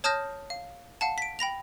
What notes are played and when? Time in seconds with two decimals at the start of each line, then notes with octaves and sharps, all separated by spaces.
0.04 C#5 A5 D#6 F6 G6 A#6
0.50 F5
1.01 F5 F#5 A5
1.18 B6 D7
1.39 G5 B5 A#6 F7